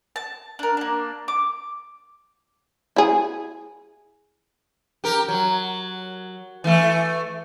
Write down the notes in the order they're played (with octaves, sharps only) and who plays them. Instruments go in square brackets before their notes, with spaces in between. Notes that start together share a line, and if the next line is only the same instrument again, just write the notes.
[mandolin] A5
D4 A#4
A#3 D4
D6
[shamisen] E4 G#4
[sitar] G4 A#4
F#3
E3 A3